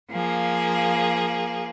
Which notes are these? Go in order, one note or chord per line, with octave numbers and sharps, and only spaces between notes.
F3 A#3 G#4